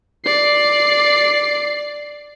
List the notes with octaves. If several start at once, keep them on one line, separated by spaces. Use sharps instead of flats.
D5 C7